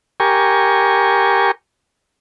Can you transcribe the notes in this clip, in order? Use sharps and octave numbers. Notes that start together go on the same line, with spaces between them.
G4 A#4 G#5 C#6